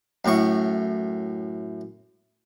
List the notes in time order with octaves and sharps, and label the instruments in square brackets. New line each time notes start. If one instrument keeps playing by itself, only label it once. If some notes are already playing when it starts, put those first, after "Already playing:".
[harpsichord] F#2 A2 C#6